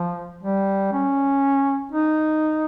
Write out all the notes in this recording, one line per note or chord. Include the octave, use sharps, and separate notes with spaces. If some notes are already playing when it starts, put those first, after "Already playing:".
Already playing: F3
G3
C#4
D#4